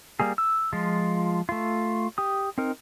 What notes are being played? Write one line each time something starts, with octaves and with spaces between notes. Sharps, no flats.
G3 A#3 G#4
E6
F3 G#3 F4
A3 F4
G4 D#6
C4 D#4 A#4